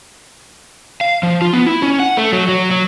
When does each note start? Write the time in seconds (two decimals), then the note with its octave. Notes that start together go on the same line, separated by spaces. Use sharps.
1.01 F5
1.23 F3
1.41 F4
1.53 B3
1.67 E4
1.82 C#4
2.00 F#5
2.17 A3
2.32 F#3
2.48 F#3
2.71 F#3